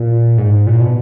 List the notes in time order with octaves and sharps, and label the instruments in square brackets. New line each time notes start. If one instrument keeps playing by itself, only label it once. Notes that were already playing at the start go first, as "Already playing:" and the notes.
Already playing: [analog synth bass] A#2
G#2
A#2
B2